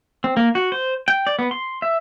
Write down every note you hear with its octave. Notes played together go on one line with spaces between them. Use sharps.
C4
A#3
F#4
C5
G5
D5
B3
C6
E5